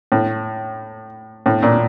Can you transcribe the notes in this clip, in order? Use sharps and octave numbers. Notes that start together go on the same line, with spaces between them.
A2
A2
A#2